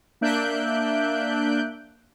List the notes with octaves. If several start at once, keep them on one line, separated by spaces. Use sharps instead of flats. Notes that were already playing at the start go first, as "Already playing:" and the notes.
A#3 D4 E5 F#6 G6 D7